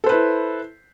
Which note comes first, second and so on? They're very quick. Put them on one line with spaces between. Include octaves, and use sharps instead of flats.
A4 C5 B4 E4